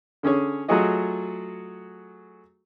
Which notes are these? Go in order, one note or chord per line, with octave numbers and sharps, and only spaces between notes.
D3 C#4 G#4 C#5
F#3 A3 F4 F#4 G#4 D#5